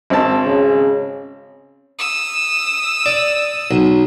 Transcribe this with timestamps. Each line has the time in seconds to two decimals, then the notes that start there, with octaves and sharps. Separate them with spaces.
0.10 G#1 C4 A5
0.45 C#3
1.99 D#6 E6
3.06 D5
3.71 B1